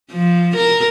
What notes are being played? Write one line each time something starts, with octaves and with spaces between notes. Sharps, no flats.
F3
A#4